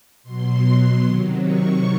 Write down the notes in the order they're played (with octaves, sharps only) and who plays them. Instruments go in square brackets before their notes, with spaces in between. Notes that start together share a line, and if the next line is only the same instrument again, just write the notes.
[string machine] B2 F#3 C6
C3 D#3 F#3
C#6